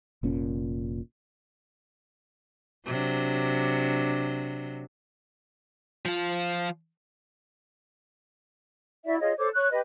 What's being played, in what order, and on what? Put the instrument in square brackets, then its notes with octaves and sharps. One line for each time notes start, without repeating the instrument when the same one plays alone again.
[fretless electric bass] F1 A#2 C#4
[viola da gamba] C3 F#3 D4
[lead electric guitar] F3 F4
[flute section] E4 F#4 D5 E5
F4 G#4 C#5 D#5
A4 C5 C#5 D6
C#5 C#6 F#6
G4 B4 D#5